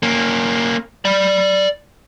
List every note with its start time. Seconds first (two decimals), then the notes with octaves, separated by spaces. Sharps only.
0.03 A#3 C#4
1.05 D5 B5